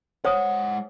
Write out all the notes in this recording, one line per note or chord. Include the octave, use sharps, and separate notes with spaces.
G#3 C5 C#5 F#5 D#6